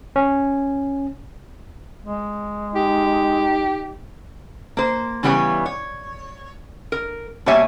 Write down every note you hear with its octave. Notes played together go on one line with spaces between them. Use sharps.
C#4
G#3
D#4 G4
A#3 C5
C#3 E3 G3 B3 G#4 C#5
C#5
A#4
B2 G3 A#3 C#5 E5 G#5